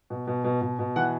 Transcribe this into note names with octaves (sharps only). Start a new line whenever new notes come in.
B2
B2
B2
B2
B2
E3 F#5